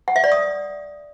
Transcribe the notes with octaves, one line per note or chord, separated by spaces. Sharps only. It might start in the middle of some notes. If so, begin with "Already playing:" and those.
F#5
E5
D5
D#6